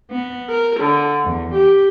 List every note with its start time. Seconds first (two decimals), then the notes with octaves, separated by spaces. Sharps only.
0.11 B3
0.50 A#4
0.80 D3
1.25 E2
1.56 G4